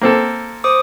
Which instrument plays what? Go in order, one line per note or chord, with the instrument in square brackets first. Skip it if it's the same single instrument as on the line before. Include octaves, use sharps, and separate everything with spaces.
[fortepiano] A#3 C4 A4
[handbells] C5 D6 D#6